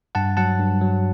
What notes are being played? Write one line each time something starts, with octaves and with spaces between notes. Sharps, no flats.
G2 F#5 A5
F#3 F#5 A5
G2
F#3